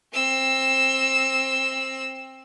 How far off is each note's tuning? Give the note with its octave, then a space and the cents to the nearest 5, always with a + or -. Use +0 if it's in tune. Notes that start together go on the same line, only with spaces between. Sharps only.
C4 +20 E6 +0